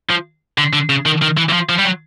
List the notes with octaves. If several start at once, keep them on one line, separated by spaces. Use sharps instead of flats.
F3
D3
D3
C#3
D#3
D#3
E3
E3
F3
F3
G3
F#3